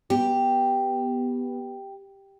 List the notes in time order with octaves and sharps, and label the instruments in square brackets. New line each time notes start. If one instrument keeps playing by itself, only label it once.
[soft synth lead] B3 [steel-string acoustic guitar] G4